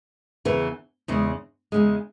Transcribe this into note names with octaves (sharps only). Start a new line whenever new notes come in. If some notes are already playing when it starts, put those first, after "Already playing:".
E2 C#3 E3 B3
E2 C#3 G#3
E2 C#3 G#3